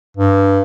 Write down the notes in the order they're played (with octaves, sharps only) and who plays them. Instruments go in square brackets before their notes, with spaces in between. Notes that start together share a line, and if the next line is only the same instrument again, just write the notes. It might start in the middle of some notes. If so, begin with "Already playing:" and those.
[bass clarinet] G2